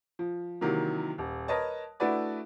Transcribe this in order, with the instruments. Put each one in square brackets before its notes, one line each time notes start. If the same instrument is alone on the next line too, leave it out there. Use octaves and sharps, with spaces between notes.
[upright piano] F3
C3 D#3 E3 F#3 A#3
D#1
A#4 B4 C#5 D#5 A5
A3 D4 E4 F#4 B4 D5